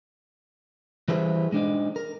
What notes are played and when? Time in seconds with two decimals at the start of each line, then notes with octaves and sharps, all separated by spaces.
1.08 E3 G3 G#4 B4 C5 E5
1.52 G#3 D4 D#4
1.96 A#4